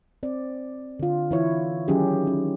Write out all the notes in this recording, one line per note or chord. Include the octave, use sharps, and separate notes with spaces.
C4 D5
D3 F4
E3 E4 C#5
D#3 F#3 C#4 D#4 G4 G#4
C#4